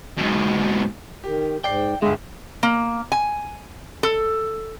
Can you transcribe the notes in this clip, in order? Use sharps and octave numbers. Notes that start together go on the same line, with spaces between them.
G#2 B2
D#3 G4
G#2 D5 G5 C7
G1 C#2 G2 D3 G#3 E5 F5
A#3
G#5
A4